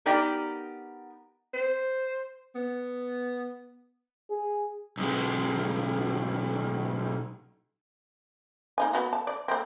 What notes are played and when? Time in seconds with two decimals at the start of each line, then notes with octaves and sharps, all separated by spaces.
0.06 B3 D#4 G4 A#4 D5 G5
1.53 C5
2.55 B3
4.30 G#4
4.97 B1 G#3
8.78 A#3 D#4 G#5
8.93 B3 F#4
9.13 A5
9.27 D5
9.48 A#3 C4